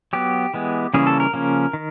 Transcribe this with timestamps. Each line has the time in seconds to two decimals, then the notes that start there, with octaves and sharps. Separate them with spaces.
0.13 F#3 B3 G4
0.54 E3 G#3 B3
0.94 C#3 E3 G3 A#3 C#4 G#4
1.07 A4
1.20 A#4
1.33 C#3 F3 A#3 C#4
1.73 D#3